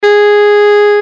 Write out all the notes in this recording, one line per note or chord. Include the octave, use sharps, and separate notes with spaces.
G#4